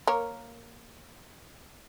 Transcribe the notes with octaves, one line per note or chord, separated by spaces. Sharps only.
A#3 A#4 C#5